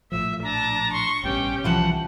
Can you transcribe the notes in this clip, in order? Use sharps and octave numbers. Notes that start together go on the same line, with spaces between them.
A#1 A2 F3 E5
D4 A5 A#5
C6 C#6
A1 G2 B2 C#4 G4 G5
C2 E3 F3 F#5 A5